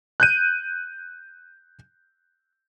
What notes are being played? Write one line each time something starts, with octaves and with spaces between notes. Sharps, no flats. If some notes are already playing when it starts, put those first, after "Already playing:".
F#6 G6 D#7